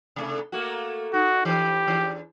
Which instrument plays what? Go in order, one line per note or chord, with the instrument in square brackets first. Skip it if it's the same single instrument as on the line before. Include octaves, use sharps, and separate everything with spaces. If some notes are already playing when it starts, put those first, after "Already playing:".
[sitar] C3 A3 D4
A3 A#3 F#4
[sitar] D#4 [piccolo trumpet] F#4
[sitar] E3 B4 [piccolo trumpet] G4
[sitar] E2 E3 D4